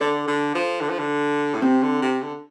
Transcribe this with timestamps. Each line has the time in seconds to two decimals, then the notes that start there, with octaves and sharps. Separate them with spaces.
0.01 D3 A4 D5
0.28 D3
0.55 F3
0.81 D3
0.90 F3
0.99 D3
1.54 A2
1.62 C3 C4
1.83 D3
2.02 C3
2.22 D3